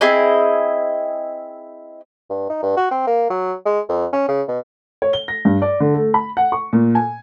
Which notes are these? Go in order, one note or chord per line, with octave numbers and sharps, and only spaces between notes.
C4 E4 G#4 D#5
G2
D#4
G2
F#4
C4
A#3
F#3
G#3
F2
C#4
C#3
B2
C#5
G7
A#6
G2
D5
D3
A3
B5
F#5
C#6
A#2
G#5